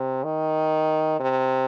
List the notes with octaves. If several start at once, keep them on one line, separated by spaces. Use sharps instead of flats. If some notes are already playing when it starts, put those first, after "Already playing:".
Already playing: C3
D#3
C3